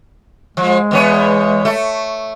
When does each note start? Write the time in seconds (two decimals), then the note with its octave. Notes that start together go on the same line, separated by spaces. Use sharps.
0.57 F3 G#3
0.91 E2 B3 C#5
1.65 A3